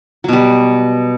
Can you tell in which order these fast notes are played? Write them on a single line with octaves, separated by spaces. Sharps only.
F#3 B2 G3